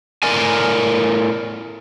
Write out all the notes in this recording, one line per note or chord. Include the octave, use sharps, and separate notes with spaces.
A2 A#4 D5 G#5